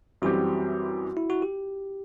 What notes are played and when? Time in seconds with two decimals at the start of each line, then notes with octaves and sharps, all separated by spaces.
0.22 F#2 E3 G3 C4 F#4 G4
1.17 E4
1.30 F#4
1.42 G4